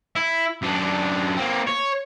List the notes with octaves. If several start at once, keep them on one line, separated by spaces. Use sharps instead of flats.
E4
F#2 D4
A#3 C4
C#5